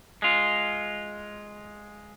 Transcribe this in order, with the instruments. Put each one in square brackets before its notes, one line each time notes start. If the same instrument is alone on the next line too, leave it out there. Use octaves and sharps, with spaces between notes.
[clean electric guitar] G#3 F4